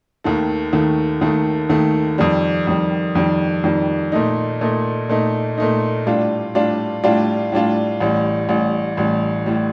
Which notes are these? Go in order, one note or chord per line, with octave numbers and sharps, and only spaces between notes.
D#2 D#3 A3
D#2 D#3 A3
D#2 D#3 A3
D#2 D#3 A3
F2 D#3 G3
F2 D#3 G3
F2 D#3 G3
F2 D#3 G3
A#2 A3 D#4
A#2 A3 D#4
A#2 A3 D#4
A#2 A3 D#4
A2 G3 D4 F4
A2 G3 D4 F4
A2 G3 D4 F4
A2 G3 D4 F4
A1 A2 G3
A1 A2 G3
A1 A2 G3
A2 G3